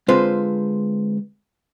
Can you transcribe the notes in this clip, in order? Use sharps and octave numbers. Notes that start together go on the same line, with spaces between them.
D3 G#3 C4 F4 B4 C5